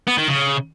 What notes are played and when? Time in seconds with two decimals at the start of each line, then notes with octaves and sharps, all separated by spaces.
0.08 B3
0.18 D#3
0.28 C#3